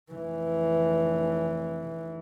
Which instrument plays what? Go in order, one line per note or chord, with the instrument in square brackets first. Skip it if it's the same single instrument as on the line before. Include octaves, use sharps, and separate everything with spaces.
[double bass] F1 E3